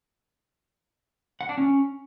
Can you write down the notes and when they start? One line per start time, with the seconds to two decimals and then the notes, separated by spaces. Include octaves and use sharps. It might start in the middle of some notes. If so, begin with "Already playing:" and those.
1.41 F#5
1.49 D4
1.58 C#4